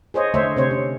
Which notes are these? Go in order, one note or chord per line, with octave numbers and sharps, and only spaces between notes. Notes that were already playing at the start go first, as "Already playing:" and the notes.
G#4 C5 C#5 D#5
D3 A3 C5 C#5 E5
C3 C5 C#5
C#4